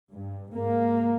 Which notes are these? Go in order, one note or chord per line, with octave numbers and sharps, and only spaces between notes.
G2
G#2 A#3